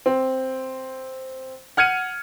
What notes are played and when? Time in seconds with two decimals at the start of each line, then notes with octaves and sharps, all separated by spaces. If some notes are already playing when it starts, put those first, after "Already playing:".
0.06 C4
1.77 F#5 F6 G#6 C#7 D#7